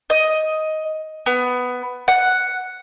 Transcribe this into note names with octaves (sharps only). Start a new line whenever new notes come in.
D#5
B3
F#5